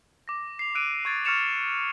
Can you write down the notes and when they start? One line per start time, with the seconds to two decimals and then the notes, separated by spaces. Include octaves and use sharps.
0.28 D6 A#6
0.59 C7 F7
0.75 E6 F#6 D7 D#7
1.05 C#6 G#6 A6 D7
1.25 C#6 F6 A6 C#7 E7 F7